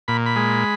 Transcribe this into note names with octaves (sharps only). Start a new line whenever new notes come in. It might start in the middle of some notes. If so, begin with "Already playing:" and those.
A#2 B5
B5
G#3